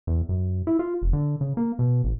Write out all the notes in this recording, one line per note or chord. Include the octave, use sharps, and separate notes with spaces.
E2
F#2
E4
F4
F1
D3
C#3
A#3
B2
A1